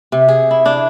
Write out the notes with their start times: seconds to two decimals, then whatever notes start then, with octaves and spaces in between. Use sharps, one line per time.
0.12 C3
0.29 G#4
0.51 E4
0.66 D4